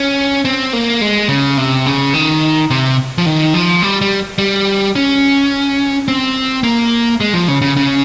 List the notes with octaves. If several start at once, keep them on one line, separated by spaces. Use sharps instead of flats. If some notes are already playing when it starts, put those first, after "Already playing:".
Already playing: C#4
C4
A#3
G#3
C#3
C3
C#3
D#3
C3
F3
D#3
F3
G3
G3
G3
C#4
C4
A#3
G#3
F3
C#3
C#3
C#3